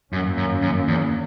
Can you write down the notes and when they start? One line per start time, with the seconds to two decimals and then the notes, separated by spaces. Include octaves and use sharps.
0.12 F#2 D#3 A#3 C#4
0.37 F#2
0.62 F#2
0.88 E2